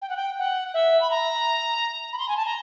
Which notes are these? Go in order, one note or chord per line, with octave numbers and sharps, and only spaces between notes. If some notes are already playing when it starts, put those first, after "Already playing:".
G5
F#5
G5
F#5
E5
B5
A#5
B5
C6
G#5
A5
A#5